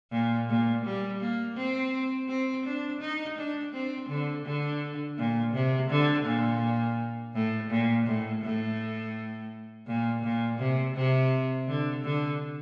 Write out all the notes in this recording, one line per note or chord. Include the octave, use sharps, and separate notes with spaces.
A#2
A#2
G3
A#3
C4
C4
D4
D#4
D4
C4
D3
D3
A#2
C3
D3
A#2
A2
A#2
A2
A2
A#2
A#2
C3
C3
D3
D3